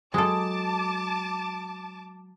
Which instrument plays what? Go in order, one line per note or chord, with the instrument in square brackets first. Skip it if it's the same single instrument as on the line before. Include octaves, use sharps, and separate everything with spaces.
[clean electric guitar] F#3 [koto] G#3 A4 [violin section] A5 D6